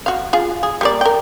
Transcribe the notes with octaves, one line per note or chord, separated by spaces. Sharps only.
F#4 F5
F4 G#4
G#4
G3 A#3 D5
A#4 G5